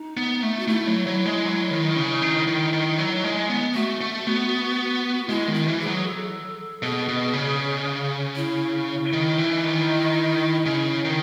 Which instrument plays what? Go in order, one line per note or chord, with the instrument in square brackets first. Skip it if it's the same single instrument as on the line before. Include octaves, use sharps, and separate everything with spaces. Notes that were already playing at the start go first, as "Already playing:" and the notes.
Already playing: [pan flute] D#4
[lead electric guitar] B3
A3
[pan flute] F#4
[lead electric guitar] A3 [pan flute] E4
[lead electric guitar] F#3
F#3
G#3
F#3
D#3
C#3
D#3
D#3
D#3
F#3
G#3
B3
[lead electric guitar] A3 [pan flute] F#4
[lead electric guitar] A3
B3
[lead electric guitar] G#3 [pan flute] E4
[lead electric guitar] D#3
[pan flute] E4
[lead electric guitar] E3
[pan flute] G#4
[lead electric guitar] F#3
[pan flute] A4
[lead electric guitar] B2 [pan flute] G#4
[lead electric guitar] B2
C#3
[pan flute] E4
[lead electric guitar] D#3
E3
D#3
C#3
D#3